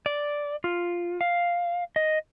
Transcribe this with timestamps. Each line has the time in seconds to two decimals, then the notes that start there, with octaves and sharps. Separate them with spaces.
0.06 D5
0.64 F4
1.21 F5
1.96 D#5